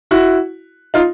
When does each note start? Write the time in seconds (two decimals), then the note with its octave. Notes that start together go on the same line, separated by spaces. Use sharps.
0.11 E4 F#4
0.94 D#4 F4